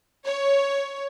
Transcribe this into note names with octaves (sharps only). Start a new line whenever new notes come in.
C#5